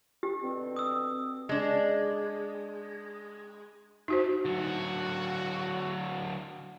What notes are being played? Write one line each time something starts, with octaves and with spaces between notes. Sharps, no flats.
G4
B2 D3 C4
D#6 E6
G#3 D4
D#4 F#4 C5
D3 F#3 F#4